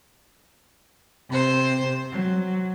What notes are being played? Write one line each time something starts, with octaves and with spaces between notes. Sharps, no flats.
C3 C5
F#3